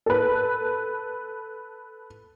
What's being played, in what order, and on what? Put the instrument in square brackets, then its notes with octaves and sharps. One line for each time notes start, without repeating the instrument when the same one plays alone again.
[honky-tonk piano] A4 B4